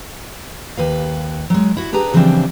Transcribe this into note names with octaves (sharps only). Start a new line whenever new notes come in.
D#2 B4 F5
F#3 G#3
E4 F#4
D4 G4 G#4 B4 A#5
C#3 E3 F3 G3 C4 D4